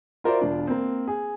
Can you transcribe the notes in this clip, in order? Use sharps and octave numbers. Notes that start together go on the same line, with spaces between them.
F4 F#4 A#4 C5 D5 E5
E1 D4 F4
A#3 C4
G#4